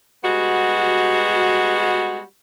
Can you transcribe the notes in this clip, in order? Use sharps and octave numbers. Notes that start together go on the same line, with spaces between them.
G3 G#3 B3 F#4